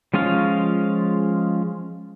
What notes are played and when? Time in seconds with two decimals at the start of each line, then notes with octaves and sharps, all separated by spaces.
0.14 F3 G#3 C#4 F4 F5